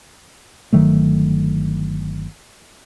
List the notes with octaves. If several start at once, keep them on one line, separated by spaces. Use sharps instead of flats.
G1 D#3 F#3 A3